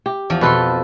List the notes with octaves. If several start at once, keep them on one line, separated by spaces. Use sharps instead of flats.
G4
E2 F3
F2 B2 A4 B4 C6